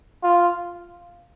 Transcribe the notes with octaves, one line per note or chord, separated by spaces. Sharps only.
F4